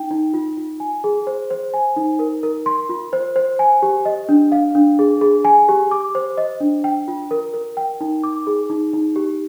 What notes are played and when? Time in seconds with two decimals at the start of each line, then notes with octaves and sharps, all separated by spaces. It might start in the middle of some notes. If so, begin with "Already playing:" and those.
Already playing: D#4 G5
0.11 D#4
0.34 F4
0.57 F4
0.80 G#5
1.04 G#4
1.27 C5
1.50 C5
1.74 G#5
1.96 D#4
2.19 A#4
2.43 A#4
2.66 C6
2.89 F4
3.13 C5
3.36 C5
3.59 G#5
3.82 G4
4.05 D#5
4.29 D4
4.52 F5
4.75 D4
4.99 G#4
5.21 G#4
5.45 G#5
5.69 G4
5.91 D6
6.15 C5
6.37 D#5
6.60 D4
6.84 G5
7.08 F4
7.31 A#4
7.54 A#4
7.77 G5
8.01 D#4
8.24 D6
8.47 G#4
8.70 D#4
8.93 D#4
9.16 G4